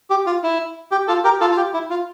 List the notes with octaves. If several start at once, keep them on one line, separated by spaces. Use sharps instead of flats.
G4
F4
E4
G4
F4 A4
G4 A#4
F4 A4
F4
G4
E4
F4